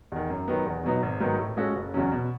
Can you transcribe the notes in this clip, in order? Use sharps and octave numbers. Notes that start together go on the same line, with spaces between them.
E2 D#3
F#2
D#3 F#3 B3
E2
B2 F#3 B3 D#4
G#1
G#2 D#3 F#3 B3
A2
G#3 C#4 F#4 A4
F#1
E2 C#3 F#3 C#4
B2